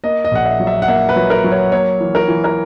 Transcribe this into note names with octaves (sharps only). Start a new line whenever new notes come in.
A#3 D#5
D#5
A#1 F#5
E5
F#3
E5
F#5
A#3 E5
B4
F#3
A#4
F#3
C#5
A#3 C#5
E3
A#4
E3
A#4